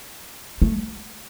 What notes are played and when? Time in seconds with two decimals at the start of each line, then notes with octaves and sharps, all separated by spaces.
0.62 A3